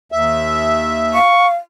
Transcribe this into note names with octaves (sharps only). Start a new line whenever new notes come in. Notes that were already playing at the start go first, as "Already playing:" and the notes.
D#2 E5
F5 C#6